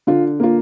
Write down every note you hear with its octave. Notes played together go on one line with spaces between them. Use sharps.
D3 F4
A#3 F4